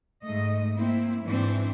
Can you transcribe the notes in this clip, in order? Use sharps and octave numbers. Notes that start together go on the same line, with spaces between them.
G#2 A3 D#5
A#3 C4 E4
G#2 E3 C4 D4